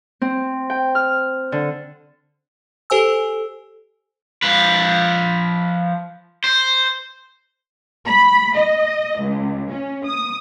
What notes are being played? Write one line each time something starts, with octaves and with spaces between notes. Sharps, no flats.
C4
G5
F6
D3
G4 A4 C5 G#5 E6
F3 B4
C5
B5
D#5
C#2
C#4
D#6